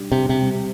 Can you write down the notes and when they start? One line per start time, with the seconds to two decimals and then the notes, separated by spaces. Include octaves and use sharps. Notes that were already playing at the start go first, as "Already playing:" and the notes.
Already playing: B2 G3 D4 G4
0.12 C3
0.17 B2
0.29 C3
0.42 G3